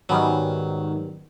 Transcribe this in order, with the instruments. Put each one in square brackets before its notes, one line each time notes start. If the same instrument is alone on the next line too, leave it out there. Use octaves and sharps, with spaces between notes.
[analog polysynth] G#2 D#3 [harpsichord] F#3 [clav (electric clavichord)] G3 B3 C#4